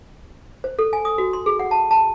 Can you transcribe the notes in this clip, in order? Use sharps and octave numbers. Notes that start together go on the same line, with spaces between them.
C5
A4
G#5
D#6
F#4
C6
G#4
F#5
A5
A5